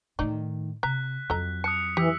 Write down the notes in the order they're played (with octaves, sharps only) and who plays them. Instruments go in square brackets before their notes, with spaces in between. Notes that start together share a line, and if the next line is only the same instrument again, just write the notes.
[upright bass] A2 D#3 [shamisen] D#4 D5
[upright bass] C3 [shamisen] A#5 [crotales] F#6 B6
[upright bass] F2 F#3 [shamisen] A4 D#5 A#5
[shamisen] A5 [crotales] D#6 F#6 C#7
[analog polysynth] E3 [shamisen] G4 [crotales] E6 B6